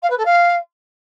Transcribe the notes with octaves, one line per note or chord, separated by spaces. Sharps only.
F5
B4
A4
F5